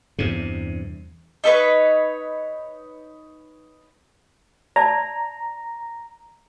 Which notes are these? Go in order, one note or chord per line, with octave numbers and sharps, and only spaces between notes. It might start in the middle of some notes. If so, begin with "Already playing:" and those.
E2 G2 C3
D#4 A4 B4 C#5
D5 A5 A#5